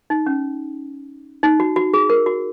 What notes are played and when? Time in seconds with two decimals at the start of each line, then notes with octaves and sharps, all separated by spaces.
0.10 D#4
0.26 C#4
1.43 D#4
1.60 F#4
1.76 F#4
1.94 G#4
2.10 A#4
2.26 F#4